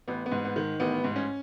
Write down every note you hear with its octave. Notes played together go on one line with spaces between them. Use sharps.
A1 B3
B3
G#2
B3
D#3
A1 B3
G#2
C#4